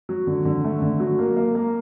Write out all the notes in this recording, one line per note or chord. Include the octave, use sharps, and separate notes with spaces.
F#3
D3
D3
A3
D3
F#3
A#3
A#3
A#3